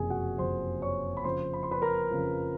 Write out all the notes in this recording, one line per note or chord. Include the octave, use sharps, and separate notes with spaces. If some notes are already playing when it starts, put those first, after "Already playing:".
Already playing: F#1 F2 C3 G#4 G#5
F#4 F#5
F#1 F2 C3 C5 C6
C#5 C#6
B5
F2 C#3 F3 C5 C6
B5
C6
B4 B5
A#4 A#5
F2 C#3 F3